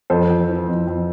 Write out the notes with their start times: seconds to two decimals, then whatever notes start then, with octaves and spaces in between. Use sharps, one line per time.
0.10 F2 A4 C5
0.29 F2
0.49 E3
0.68 F2
0.87 F2